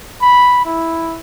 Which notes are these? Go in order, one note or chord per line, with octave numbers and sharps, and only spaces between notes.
B5
E4